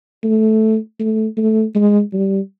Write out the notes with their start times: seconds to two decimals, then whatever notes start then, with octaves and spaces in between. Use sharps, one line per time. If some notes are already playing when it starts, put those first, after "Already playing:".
0.24 A3
1.00 A3
1.37 A3
1.75 G#3
2.13 G3